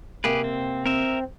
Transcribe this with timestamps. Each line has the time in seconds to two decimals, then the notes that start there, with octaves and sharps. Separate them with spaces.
0.24 C3 A#3 G4 G#4 B4
0.44 C4
0.86 C4 A#4 E5